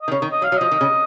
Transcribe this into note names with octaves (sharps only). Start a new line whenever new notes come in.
D#5
D#3
C#3 C#5
D#3
D#5
F#3 F5
F#3
F3 D#5
D#3
C#3